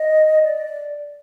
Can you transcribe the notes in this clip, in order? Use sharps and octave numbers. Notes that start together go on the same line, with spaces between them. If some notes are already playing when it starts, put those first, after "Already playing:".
Already playing: D#5
D5